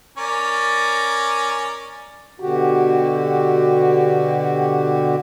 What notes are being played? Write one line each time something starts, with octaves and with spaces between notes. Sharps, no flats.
C#4 A#4 D5
B2 D3 F#4 G4